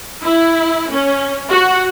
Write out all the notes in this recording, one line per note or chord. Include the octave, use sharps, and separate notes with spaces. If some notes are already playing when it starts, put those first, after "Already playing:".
E4
C#4
F#4